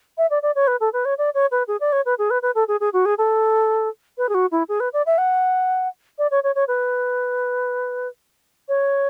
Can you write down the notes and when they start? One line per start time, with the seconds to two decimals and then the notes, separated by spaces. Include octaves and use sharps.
0.18 E5
0.30 D5
0.43 D5
0.55 C#5
0.67 B4
0.80 A4
0.93 B4
1.05 C#5
1.18 D5
1.34 C#5
1.51 B4
1.68 G#4
1.80 D5
1.92 C#5
2.06 B4
2.19 G#4
2.30 B4
2.42 B4
2.55 A4
2.68 G#4
2.81 G#4
2.93 F#4
3.05 G#4
3.18 A4
4.18 B4
4.29 G#4
4.34 F#4
4.51 E4
4.69 G#4
4.80 B4
4.93 D5
5.06 E5
5.18 F#5
6.18 D5
6.31 C#5
6.44 C#5
6.55 C#5
6.68 B4
8.69 C#5